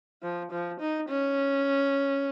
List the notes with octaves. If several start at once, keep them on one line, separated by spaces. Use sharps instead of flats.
F3
F3
D#4
C#4